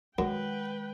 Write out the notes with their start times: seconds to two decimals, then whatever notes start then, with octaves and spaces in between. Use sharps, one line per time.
0.18 F#2 D#3 G#3 B4 F#5 G5